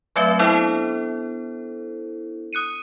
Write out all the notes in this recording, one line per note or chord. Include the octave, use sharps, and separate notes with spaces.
F#3 A3 C4 B4 E5
B3 D4 E4 A4 C5
D#6 F#6 C#7 D#7